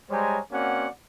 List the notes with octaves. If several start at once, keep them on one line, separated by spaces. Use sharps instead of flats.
G3 G#3 C5 C#5 G#5 A#5
A#3 C4 C#4 F#4 D5 F#5